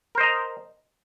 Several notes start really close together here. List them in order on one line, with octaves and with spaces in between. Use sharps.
A#4 C5 D#5 A#5